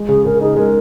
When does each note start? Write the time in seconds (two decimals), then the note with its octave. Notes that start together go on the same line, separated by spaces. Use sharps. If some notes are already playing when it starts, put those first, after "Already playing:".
Already playing: G#3
0.09 C#3 G#4
0.26 C#3 A#4
0.41 D#4 G#4
0.57 G#3 A#4